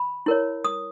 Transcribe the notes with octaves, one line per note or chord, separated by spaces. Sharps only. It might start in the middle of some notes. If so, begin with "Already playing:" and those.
Already playing: B5
E4 A#4 C#5
D#6